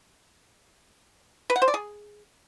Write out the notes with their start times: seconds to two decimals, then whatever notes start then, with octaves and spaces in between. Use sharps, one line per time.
1.50 B4
1.56 F#5
1.62 C5
1.68 D5
1.74 G#4